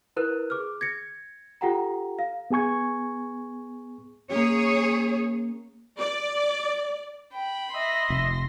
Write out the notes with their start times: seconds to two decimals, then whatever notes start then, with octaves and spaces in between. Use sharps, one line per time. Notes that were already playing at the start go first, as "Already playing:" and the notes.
0.17 E4 A#4 B4 F#6
0.50 G#4 D6 F6
0.81 G#6 A#6 C#7
1.61 F4 G4 A4 F#5 G5 A#5
2.19 F5
2.51 B3 G#4 G#5 C#6 G#6
4.31 A#3 C#4 G#4 C#5
5.99 D5
7.33 G5 B5
7.73 D#5 E5 C6 A#6
8.10 F1